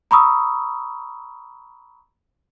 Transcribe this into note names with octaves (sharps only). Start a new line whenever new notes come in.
A#5 B5 C#6 D#6 E6